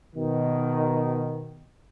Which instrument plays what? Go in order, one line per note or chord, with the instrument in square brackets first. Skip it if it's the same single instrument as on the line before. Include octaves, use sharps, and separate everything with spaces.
[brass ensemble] B2 D#3